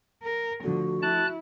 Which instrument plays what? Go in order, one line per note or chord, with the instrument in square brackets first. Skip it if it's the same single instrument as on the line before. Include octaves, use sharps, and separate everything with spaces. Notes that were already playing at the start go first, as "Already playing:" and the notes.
[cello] A#4
[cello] D3 [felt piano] F3 A3 [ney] F#4
[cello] E4 [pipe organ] A5 F#6